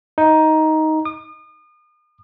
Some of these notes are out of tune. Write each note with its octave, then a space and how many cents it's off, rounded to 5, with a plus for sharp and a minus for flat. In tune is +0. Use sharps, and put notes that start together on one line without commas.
D#4 +10
D#6 -40